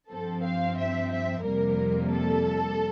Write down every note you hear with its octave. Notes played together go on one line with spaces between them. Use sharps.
G2 F3 C4 A4
F5
E5
E5
F2 C3 G3 A#3 A#4
A4